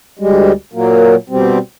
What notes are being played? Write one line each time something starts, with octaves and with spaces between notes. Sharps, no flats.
D2 G3 G#3
A#2 F#3 A#3
B2 G3 C4